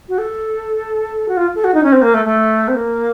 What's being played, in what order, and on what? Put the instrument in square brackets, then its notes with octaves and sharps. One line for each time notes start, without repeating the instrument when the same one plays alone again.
[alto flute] F#4
A4
F#4
F4
A4
F#4
D#4
C#4
C4
A#3
A3
A3
C4
A#3